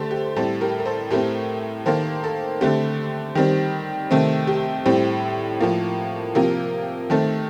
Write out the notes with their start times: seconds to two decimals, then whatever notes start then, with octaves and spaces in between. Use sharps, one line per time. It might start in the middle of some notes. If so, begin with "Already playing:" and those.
Already playing: D3 A3 G4 A4 C5
0.11 G4
0.36 A2 G3 C4 A4
0.61 G4 A#4
0.80 A#4
0.85 A4 C5
1.10 A2 A3 C4 G4 A#4
1.86 D#3 A#3 A4 C5
2.24 A4
2.61 D3 A3 C4 G4
3.35 D#3 G3 C4
4.11 C3 D#3 A3 C4
4.47 G4
4.86 A2 G3 C4
5.61 A2 F3 A#3
6.35 C3 F3 A#3 G4 A#4
7.10 D#3 A3 C4 A4